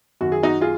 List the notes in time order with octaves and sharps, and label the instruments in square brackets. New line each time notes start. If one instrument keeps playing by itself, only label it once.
[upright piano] F#2 D#3 F#4
G#4
D#4 F#4
F4 G#4